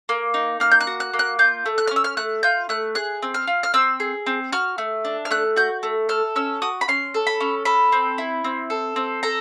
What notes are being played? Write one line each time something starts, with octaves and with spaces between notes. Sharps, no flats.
A#3
D#4
A#3 F6
G6
F#6
F#4
F#6
A#3
F#6
F4 G6
A3
F#6
F6
C#4
E6
F6
A3 F#6
F4 G6
A3 F#6
G#4 F#6
C4
F6
F4
F6
C4 E6
G#4
C4
F#4 F6
A3
D4
F6
A3 F#6
F#4 G6
A3
A4 F6
C#4 E6
F#4 D#6
B5
C#4 C6
A4
B5
C#4
A4 B5
C4
E4
C4
A4
C4
A4 A#5